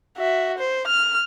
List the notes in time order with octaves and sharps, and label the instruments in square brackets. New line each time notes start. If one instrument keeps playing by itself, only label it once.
[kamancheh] F#4 E5
C5
F6